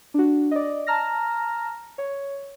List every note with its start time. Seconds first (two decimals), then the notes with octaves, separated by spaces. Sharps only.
0.14 D4 F#4
0.51 D5 D#5
0.87 A5 A#5 F6 A#6
1.98 C#5